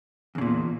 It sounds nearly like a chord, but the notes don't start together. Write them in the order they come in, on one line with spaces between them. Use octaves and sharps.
E2 C#3 A#2